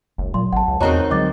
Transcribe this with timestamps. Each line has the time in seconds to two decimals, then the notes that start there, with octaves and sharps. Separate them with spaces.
0.18 F#1 C#2
0.34 A#2 F#3 C6
0.53 G#1 F#5 A5
0.68 C#2
0.81 E2 D#3 C4 F#4 C#5 D#5 A#5
1.10 C#2 D3 F#3 G#3 D#5 D6 A6